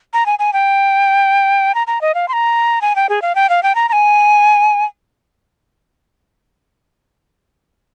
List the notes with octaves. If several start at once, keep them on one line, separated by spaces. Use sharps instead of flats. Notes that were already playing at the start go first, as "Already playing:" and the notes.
A#5
G#5
G#5
G5
A#5
A#5
D#5
F5
C6
A#5
G#5
G5
G#4
F5
G5
F5
G5
A#5
A#5
G#5